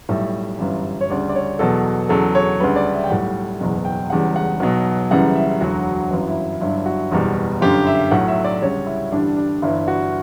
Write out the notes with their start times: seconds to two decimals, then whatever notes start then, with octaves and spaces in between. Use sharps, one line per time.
0.09 B1 A2 G3 E5
0.59 G1 F#2 E3 G3 E5
1.01 C#5
1.09 D2 C#3 G3 D5
1.29 D5
1.35 C#5
1.59 E2 B2 F#3 A4
2.09 E2 C#3 F#3 A4
2.35 C#5
2.60 D2 C#3 G3 B4
2.76 D5
2.94 E5
3.04 G5
3.10 B1 A2 G3 F#5
3.60 F#1 E2 B2 F#3 F#5
3.85 G5
4.10 E1 E2 C#3 G3 F#5
4.36 F#5
4.60 B1 B2 F#3
5.11 F#1 F#2 C#3 E3 G3 F#5
5.36 E5
5.61 E1 D2 D3 F#3 F#4
6.11 G1 F#2 E3 F#4
6.28 E4
6.61 G1 G2 F#3 E4
6.86 F#4
7.11 F#1 E2 B2 G3
7.61 G1 F#2 D3 G4
7.87 E5
8.11 B1 A2 F#3 F#5
8.28 E5
8.44 D5
8.62 D2 C#3 G3 C#5
8.87 E4
9.12 A1 G2 D3 G3 D4
9.36 D4
9.62 G1 G2 E3 E4
9.88 F#4